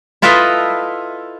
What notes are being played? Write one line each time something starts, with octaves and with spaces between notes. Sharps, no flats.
E4 F4 A4 B4 D#5 E5